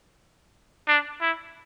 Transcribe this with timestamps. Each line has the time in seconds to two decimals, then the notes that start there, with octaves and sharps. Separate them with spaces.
0.88 D4
1.21 E4